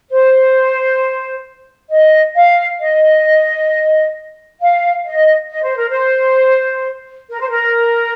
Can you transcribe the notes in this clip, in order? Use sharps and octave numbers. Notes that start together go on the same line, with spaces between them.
C5
D#5
F5
D#5
F5
D#5
D#5
C5
A#4
C5
A#4
C5
A#4